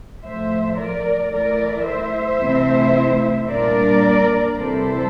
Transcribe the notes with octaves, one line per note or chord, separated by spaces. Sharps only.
A2 F3 A3 C5 E5
A#4 D5
E3 A3 E4 A#4 D5
C5 E5
C3 E3 A3 E4
A#2 G3 A#3 D4 A#4 D5
C3 E3 G3 C4 E4 A4 C5